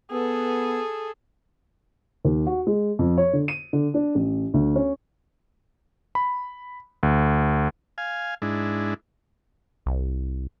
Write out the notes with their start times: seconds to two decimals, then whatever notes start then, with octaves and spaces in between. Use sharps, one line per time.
0.11 B3 G#4 A4
2.25 D#2
2.47 F#4
2.67 G#3
2.99 F2
3.18 C#5
3.33 D3
3.48 D#7
3.73 D3
3.94 D4
4.15 A1
4.54 D2
4.76 C#4
6.15 B5
7.03 D2
7.98 F5 G#5
8.42 G#2 G#3 D4 E4
9.86 C2